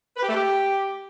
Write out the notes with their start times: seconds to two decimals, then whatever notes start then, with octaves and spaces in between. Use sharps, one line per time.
0.17 B4
0.23 G4
0.29 A3
0.35 G4